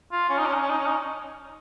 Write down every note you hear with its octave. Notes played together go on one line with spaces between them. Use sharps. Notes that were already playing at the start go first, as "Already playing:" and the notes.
F4
C#4
D#4
C#4
D#4
C#4
D#4
C#4
D#4